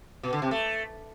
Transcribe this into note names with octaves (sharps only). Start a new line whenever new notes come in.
B2
D3
C3
A3